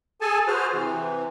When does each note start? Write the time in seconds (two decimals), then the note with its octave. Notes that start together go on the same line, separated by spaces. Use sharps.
0.21 G#4 A4 G#5 A5
0.47 F#4 G#4 B4 C5 F6
0.73 C3 E3